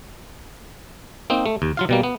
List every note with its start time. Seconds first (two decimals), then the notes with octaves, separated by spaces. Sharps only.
1.30 A#3 C4 D#4
1.46 A3
1.62 D#2
1.77 F#3 F4 F5
1.89 B2 G3 A#3
2.03 B3